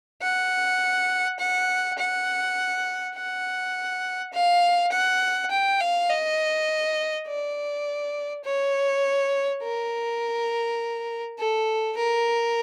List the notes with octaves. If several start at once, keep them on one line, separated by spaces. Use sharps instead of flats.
F#5
F#5
F#5
F#5
F5
F#5
G5
F5
D#5
D5
C#5
A#4
A4
A#4